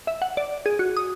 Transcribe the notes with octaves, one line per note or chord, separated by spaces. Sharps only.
E5
F#5
D5
G#4
F#4
D#6